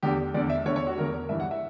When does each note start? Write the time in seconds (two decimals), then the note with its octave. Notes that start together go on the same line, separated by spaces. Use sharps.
0.03 E2 D3 G4
0.34 E2 D3 D5
0.50 E5
0.65 E2 D3 C#5
0.76 C#5
0.87 F#4
0.97 E2 D3 A#4
1.29 G2 E3 E5
1.40 F#5
1.51 E5